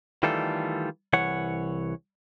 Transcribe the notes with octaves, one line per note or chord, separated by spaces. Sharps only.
D#3 E3 G3 A3 F4 A4
C2 E3 C#5 F#5